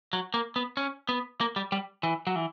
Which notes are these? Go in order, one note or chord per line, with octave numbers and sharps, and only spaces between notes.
F#3
A#3
B3
C#4
B3
A#3
G3
G3
E3
F#3
E3